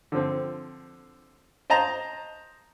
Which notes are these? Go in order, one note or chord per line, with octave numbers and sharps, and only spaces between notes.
D3 F3 C4
C5 D#5 A5 A#5